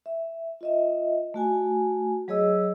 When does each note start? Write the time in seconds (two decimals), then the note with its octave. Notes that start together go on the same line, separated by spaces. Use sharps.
0.06 E5
0.61 F4 D#5 E5
1.34 A3 F#4 G#5
2.28 F#3 G#4 C#5 D#5 E6